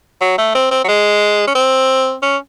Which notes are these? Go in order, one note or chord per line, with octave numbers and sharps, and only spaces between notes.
F#3
A3
C4
C4
F#3
G#3
C#4
C4
C#4